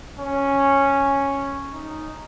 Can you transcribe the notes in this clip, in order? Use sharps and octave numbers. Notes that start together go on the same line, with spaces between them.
C#4
D#4